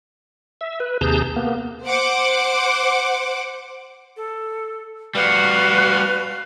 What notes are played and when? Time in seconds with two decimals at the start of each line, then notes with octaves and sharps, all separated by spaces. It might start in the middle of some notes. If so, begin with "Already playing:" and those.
0.61 E5
0.80 B4
1.01 D#2 C3 G#4 A5 A#5 G6
1.36 A#3 B3
1.87 C5 F#5 D6
4.17 A4
5.15 G3 F#4 B4 F5